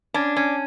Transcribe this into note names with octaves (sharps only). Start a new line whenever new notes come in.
C#4 D4
C#4